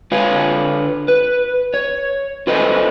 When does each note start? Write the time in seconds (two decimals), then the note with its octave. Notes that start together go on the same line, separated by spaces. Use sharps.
0.12 D3 F4 B4 C#5 F5
1.08 B4
1.74 C#5
2.47 F4 A4 B4 C5 D#5